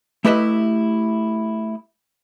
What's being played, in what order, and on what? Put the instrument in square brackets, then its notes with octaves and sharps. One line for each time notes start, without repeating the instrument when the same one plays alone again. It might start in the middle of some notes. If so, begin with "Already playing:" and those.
[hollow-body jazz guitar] A3 E4 G4 B4 D#5 E5